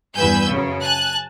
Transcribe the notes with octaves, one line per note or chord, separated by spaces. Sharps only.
E2 G2 B4 G#5 E6 G6
F#2 C#3
G#5 A5 F#6